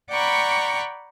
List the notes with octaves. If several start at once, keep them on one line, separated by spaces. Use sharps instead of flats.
D5 F#5 G5 A#5 B5 C#6